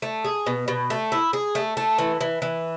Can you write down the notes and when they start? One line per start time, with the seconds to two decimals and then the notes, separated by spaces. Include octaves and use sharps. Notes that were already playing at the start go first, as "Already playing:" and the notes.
0.02 A3
0.25 G#4
0.46 B2
0.68 B2
0.90 A3
1.12 E4
1.33 G#4
1.55 A3
1.77 A3
1.98 E3
2.21 E3
2.42 E3